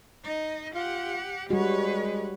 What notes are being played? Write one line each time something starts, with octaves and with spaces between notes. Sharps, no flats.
D#4 D#5
F4 G4 F#5
G3 G#3 F#4 B4 C#5